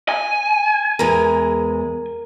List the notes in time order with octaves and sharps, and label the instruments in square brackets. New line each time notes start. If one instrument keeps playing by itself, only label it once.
[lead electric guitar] G#5
[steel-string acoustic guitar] E2 G#3 [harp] A#4